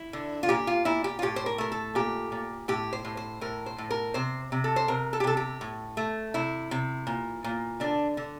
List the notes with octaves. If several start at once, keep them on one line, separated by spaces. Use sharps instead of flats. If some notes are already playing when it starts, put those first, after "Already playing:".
Already playing: E4
D3
F4
A#2 G4
F4
A#2 E4
G4
F4
A2 G4
C5
A#4
A3 A#4
A4
A#2 G4
A#2
A2 G4
C5
A2
C5
A2 A#4
C5
A2
A#4
C3 C5
C3
A4
C5
C3 A#4
A4
G4
C3 A4
G4
A2
A3
C3 E4
C3
A#2
A#2
D3 D4
D3